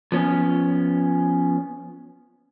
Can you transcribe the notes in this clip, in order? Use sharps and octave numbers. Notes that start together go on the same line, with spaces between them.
F3 B3 C#4